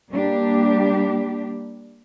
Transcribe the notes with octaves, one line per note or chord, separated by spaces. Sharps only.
G3 A#3 D4 G4